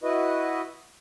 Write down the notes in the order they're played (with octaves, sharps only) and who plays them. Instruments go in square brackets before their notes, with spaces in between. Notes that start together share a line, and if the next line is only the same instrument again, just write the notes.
[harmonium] E4 F#4 B4 D#5